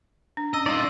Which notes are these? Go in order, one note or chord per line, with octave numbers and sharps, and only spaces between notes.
D4
C#4 D#5 E6
D#3 F4 D5 D#5